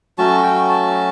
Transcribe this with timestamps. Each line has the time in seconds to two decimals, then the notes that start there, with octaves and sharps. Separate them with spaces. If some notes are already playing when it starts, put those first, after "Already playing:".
0.18 F#3 A3 C#4 F#4 A5
0.43 G5
0.69 A5